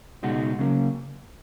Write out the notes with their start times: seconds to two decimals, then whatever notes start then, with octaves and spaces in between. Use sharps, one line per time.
0.23 C#2 B2 G#3 D#4 F#4
0.59 C#3 F#3 A#3